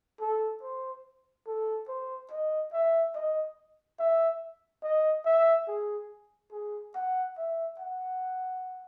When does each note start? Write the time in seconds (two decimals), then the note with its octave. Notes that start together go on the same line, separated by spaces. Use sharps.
0.21 A4
0.63 C5
1.47 A4
1.88 C5
2.31 D#5
2.73 E5
3.15 D#5
3.99 E5
4.83 D#5
5.25 E5
5.68 G#4
6.52 G#4
6.95 F#5
7.37 E5
7.79 F#5